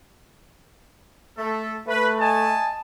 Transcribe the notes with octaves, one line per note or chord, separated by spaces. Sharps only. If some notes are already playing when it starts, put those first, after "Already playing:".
A3 A4
A3 B4
D#5 G#5 A5